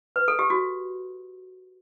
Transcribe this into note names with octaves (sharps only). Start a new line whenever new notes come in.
B4
A4
G4
F#4